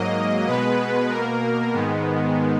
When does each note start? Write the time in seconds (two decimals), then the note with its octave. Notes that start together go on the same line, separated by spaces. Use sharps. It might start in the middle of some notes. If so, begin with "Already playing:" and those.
Already playing: G#2 F#3 A#3 D#5
0.47 B2 G#3 B3 B4
1.10 B2 A#3 A#4
1.73 G#2 D#3 G#3 B3